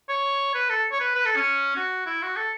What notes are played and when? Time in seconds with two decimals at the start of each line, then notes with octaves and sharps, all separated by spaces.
0.09 C#5
0.55 B4
0.69 A4
0.92 C#5
1.00 B4
1.15 B4
1.25 A4
1.36 C#4
1.76 F#4
2.06 E4
2.22 F#4
2.37 A4